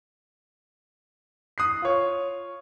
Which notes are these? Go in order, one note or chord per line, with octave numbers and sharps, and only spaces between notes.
D#6 F#6 C7
F4 C#5